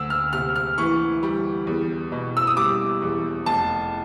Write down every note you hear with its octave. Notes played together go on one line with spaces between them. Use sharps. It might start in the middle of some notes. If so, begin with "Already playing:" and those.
Already playing: D2 E6
F6
C3 F6
F6
E3 C#6
G3
E2
B2
E6
D#6
G3 D6
E2
F1 A5